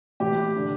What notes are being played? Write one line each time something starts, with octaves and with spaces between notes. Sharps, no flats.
A2 E3 G4
D3